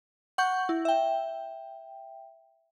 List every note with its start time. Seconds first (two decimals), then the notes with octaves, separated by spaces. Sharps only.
0.38 F#5 C#6 G6
0.69 E4
0.85 E5 G5